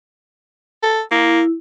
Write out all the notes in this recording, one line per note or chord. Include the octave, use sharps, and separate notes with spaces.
A4
A#3 E4